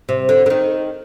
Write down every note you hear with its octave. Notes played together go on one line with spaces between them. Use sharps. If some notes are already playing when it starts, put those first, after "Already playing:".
C3
D3
D3
D#3